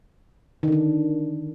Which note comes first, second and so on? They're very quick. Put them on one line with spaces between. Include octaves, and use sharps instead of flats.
D#3 D3 D4